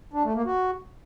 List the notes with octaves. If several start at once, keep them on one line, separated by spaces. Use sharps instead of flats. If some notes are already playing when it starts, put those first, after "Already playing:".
D4
A3
A#3
F#4